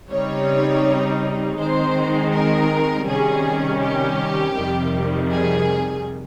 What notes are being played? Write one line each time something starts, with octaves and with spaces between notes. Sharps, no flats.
C#3 G3 C4 D#4 C#5
D#3 G#3 C4 D#4 C5
A#4
C3 D#3 G3 C#4 G#4
G4
F2 C3 D#3 G3
G#4